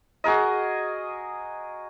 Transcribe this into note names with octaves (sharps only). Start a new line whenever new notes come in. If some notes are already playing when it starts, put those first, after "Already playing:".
F#4 G#4 A#4 D#5